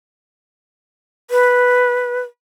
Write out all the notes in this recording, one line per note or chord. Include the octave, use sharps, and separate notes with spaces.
B4